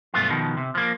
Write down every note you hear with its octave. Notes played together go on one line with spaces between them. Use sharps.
B1 G2 A3 B3 F4
B2 D#3 F3
C3
F3 A#3